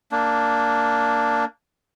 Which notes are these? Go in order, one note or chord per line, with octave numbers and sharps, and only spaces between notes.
A#3 D4